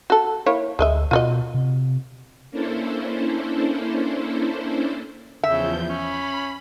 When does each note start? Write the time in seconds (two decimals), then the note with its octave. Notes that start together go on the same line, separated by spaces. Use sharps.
0.10 F#4 A4
0.46 A#3 E4 C#5
0.79 D2 G#3 D#5 E5
1.11 B2 F4 F#4 D#5
1.54 C3
2.51 A#3 C#4 D4 E4 A4 C5
5.43 E2 C#3 F3 E5 G6
5.89 C#4 B5